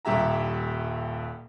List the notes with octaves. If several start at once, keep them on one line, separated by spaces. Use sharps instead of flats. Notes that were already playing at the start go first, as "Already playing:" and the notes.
D#1 G2 G4 E5 A#5